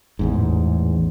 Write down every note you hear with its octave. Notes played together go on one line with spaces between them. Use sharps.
A1 E2 G#2